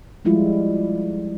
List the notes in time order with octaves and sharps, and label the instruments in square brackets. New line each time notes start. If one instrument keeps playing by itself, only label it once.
[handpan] F3 G3 G#3 E4 F4